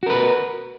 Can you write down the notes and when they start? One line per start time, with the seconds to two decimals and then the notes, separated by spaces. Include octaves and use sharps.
0.03 F#4
0.06 A#4
0.10 B4